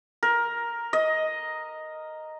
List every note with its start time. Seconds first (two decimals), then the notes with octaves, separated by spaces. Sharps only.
0.23 A#4
0.93 D#5